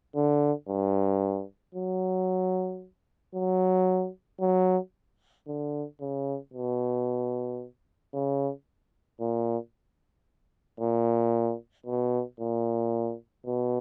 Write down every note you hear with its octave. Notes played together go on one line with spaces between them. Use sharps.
D3
G2
F#3
F#3
F#3
D3
C#3
B2
C#3
A#2
A#2
B2
A#2
B2